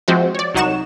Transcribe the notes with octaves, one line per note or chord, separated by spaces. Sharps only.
F3 G#3 C4 F#4 C5 E5
C#5 D5
C2 F#3 D#4 F#5 C#6 E7